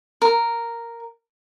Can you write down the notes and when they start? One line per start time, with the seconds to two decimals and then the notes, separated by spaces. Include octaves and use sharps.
0.22 A#4